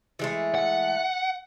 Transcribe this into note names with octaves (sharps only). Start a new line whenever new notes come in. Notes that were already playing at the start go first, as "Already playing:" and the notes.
E3 G#3 A3
F#5